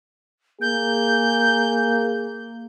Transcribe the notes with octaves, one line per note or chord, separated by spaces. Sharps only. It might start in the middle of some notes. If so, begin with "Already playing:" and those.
A#3 G#4 G6